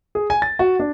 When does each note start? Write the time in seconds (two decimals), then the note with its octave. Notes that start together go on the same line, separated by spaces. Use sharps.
0.15 G#4
0.30 G#5
0.42 A6
0.59 F#4
0.80 D4